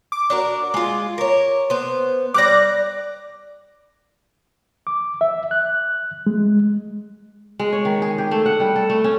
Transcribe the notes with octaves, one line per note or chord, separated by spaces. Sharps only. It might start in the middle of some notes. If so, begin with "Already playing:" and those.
D6
D4 F#4 A#4
G#3 F4
A#4 C#5
B3 C5
G3 D5 D6 F#6 A#6
D6
E5
F#6
G#3
G#3
C#5
D#3
G#4
G4
A3
F#5
G3
A4
A3
C#4